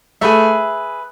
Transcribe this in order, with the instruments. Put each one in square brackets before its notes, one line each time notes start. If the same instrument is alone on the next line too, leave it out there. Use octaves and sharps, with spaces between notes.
[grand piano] A3 [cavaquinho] G#4 B4 E5